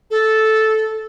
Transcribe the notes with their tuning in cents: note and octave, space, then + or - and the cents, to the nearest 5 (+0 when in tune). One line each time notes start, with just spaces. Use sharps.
A4 -10